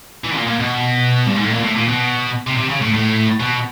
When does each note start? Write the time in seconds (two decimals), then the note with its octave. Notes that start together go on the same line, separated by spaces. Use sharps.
0.24 E3
0.36 A#2
0.47 A#2
0.59 B2
1.27 G2
1.36 G#2
1.44 A2
1.52 A#2
1.64 A2
1.76 A#2
1.88 B2
2.47 C3
2.58 C3
2.69 C#3
2.82 A2
2.94 A2
3.40 B2